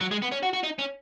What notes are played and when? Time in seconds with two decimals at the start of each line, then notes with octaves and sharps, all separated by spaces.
0.01 F#3
0.11 G#3
0.22 B3
0.32 C#4
0.43 F#4
0.53 F#4
0.63 D#4
0.79 C#4